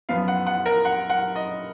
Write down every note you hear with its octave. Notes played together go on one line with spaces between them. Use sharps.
F#2 F3 B3 F5
F#5
F#5
A#4
F#5
F#5
D#5